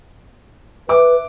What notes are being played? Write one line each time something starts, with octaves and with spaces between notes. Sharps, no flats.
B4 E5 D6